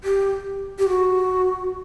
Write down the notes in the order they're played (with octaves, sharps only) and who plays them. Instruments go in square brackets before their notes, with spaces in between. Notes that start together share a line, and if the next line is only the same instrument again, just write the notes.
[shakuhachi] G4
G4
F#4